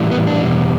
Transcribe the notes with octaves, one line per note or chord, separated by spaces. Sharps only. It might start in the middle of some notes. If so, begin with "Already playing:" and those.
Already playing: A2 E3 G3
B3
D4
E2 B2 G3